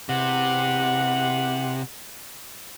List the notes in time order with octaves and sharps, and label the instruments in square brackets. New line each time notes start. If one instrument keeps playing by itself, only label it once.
[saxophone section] E2 G4 F#5 [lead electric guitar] C3